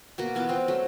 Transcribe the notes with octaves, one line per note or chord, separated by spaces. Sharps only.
B2 A#3 F#4
E3 B3 F4 D6
C4 F4 C5
F#3 A3